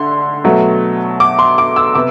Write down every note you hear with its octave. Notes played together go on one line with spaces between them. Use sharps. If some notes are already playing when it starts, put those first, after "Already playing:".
Already playing: D3 A3 C6
B2 F#3 A3
D6
C6
D6
E6
C3 B3 D6